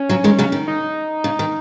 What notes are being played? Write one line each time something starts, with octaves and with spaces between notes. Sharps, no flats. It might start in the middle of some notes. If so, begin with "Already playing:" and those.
Already playing: C#4
C#3 F#3
D#3 G#3
C#3 F#3
D#3
D#4
C#3
D#3